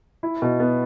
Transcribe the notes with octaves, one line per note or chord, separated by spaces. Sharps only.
E4
B2
B3